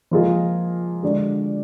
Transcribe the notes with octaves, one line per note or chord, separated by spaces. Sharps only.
F3 A#3 F4 G#4 D#5
D3 G#3 D4 F#4 D5